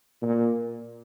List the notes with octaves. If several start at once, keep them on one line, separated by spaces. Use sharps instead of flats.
A#2